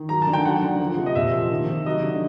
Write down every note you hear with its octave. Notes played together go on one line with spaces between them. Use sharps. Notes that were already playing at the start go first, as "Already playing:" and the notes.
Already playing: D#3
F#3 A#5
D3 A5
G5
F#3 F#5
D3
F3
C3
D#5
A#2 E5
F3
D#3
C3
F#3 D#5
D3